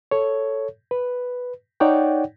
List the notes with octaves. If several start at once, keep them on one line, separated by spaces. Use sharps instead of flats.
A4 C#5
B4
D#4 C#5 D5 F#5 G5